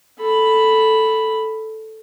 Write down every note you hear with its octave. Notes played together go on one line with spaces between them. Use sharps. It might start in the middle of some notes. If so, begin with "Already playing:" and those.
A4 B5